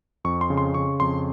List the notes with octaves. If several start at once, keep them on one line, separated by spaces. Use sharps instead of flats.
F2 C#6
C6
C#3
C6
C#3 C#6
F2 C6